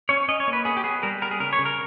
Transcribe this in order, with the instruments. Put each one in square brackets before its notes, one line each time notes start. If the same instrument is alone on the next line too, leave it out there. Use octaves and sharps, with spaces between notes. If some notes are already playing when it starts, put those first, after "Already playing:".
[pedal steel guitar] C#4 C#5
C#4 D#5
C#5
A#3
B4
B3 G#4
G4
B3 G#4
G3 A#4
B3 A#4
G#4
C#3 A#4
C#5
C#3
A#4